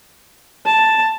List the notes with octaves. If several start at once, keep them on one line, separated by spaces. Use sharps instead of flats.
A5